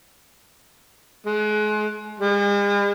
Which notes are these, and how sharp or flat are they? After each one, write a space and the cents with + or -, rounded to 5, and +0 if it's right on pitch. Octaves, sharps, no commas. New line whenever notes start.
G#3 +35
G#3 -45